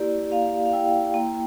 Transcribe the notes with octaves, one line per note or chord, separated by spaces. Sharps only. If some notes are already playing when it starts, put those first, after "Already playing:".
Already playing: A#3 E4 G4 D5
A#3 F5
F5
E4 G5
A#3